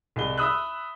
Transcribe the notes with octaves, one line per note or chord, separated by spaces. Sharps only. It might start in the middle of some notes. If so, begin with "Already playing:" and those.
C2 G#3 G7
E5 B5 D#6 E6 F#6